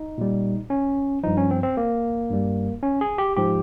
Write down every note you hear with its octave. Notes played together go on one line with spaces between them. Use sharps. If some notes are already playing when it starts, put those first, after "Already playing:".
Already playing: D#4
A#2 G3
C#4
G2 F3 D#4
C#4
C4
C4
A#3
G2 G3
C#4
G#4
G4
G#2 F3 G4